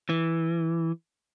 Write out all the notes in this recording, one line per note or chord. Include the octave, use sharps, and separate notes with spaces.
E3